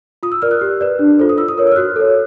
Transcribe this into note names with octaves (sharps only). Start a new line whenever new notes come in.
F4 D#6
E6
A#4 D5 F6
F#6
G4
B4 D5
D4
F4 A4 C5
D#6
F4 E6
D#6
A#4 C#5
E6
F6
F#4 F#6
A4 C#5